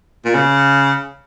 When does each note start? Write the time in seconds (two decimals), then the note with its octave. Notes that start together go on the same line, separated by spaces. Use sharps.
0.25 A#2
0.35 C#3